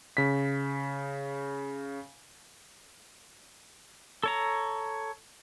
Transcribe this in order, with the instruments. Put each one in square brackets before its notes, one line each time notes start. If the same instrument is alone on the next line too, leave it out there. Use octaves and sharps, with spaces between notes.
[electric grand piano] C#3 B6
[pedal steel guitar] A4 C#5 A#5